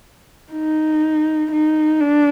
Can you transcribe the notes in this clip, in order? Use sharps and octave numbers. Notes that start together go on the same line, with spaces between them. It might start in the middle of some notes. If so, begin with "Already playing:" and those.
D#4
D#4
D4